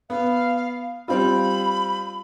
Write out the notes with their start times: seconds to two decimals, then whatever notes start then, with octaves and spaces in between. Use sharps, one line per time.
0.10 B3 F5
1.08 G3 C4 F4 B5